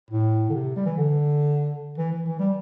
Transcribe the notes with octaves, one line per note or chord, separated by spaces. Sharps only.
A2
D3
C3
G3
E3
D3
E3
E3
E3
G3